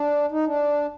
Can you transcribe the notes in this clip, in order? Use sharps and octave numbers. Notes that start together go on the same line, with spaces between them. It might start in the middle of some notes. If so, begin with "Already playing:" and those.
Already playing: D4
D#4
D4